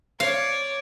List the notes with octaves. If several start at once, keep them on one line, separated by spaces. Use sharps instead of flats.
C#5 D5 F5